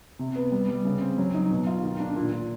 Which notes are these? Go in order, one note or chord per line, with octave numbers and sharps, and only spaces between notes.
C3
B3
G3
G3
C#3
C4
F#3
D#4
B2
F4
D#3
D4
A#2
A#2